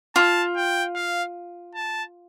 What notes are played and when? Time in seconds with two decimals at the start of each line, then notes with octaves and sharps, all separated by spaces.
0.16 F4 A5
0.56 G5
0.95 F5
1.75 A5